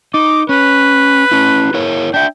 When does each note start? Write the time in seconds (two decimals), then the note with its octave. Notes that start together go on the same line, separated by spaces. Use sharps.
0.14 D#4 D6
0.49 C#4 B4
1.32 C#4 E4
1.74 E4 A#4 C#5
2.14 D4 E5 G5